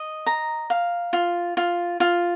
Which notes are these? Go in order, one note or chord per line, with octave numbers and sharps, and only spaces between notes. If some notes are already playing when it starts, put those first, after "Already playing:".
Already playing: D#5
A#5
F5
F4
F4
F4